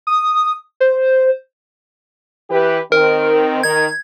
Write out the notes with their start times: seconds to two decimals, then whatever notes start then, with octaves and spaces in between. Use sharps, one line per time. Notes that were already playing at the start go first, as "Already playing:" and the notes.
0.07 D#6
0.80 C5
2.49 E3 G4 B4
2.92 D#3 C4 A#4
3.63 D#3 G#6